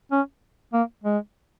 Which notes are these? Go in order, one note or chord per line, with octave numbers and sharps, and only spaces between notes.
C#4
A#3
G#3